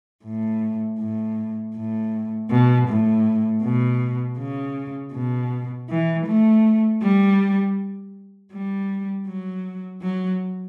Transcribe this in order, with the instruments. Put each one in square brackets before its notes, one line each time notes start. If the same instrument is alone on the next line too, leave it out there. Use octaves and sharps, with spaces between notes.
[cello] A2
A2
A2
B2
A2
B2
C#3
B2
E3
A3
G3
G3
F#3
F#3